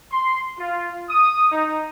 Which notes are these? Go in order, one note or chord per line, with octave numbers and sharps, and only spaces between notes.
C6
F4
D#6
D#4